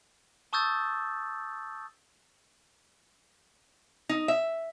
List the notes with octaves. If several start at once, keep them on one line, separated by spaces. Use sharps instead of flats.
A5 C#6 D#6 E6 G6 A6
D#4
E5